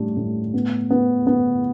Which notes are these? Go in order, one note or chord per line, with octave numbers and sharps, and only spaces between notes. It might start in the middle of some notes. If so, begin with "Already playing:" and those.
Already playing: A2 G3 D4
A2
B3
B3
B3